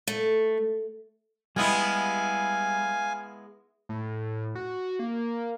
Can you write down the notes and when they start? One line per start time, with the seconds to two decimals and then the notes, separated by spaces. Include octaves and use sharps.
0.07 A3
1.56 G3 G#3 B3 E4 G4 F5 G#5
3.89 A2
4.55 F#4
4.99 A#3